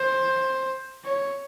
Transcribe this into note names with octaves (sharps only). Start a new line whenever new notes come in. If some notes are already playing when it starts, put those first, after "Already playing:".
Already playing: C5
C#5